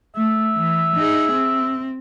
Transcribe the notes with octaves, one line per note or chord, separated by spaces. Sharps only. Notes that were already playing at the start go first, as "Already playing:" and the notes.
A3 E5
E3
D#4 G#4
C4